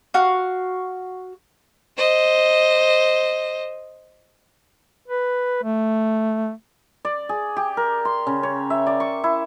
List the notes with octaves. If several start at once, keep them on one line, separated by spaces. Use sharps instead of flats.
F#4 F5
C5 D#5
B4
A3
D5
G#4
G4
A#4
C6
C#3
C#5
E5
D5
C#6
E4